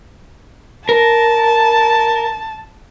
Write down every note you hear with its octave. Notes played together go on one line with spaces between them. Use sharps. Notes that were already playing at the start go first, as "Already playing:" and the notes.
A#4 A5